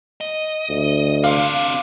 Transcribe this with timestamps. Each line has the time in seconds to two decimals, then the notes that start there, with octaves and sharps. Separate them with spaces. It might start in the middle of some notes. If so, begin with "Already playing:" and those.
0.21 D#5
0.69 D2
1.24 C4 D4 F5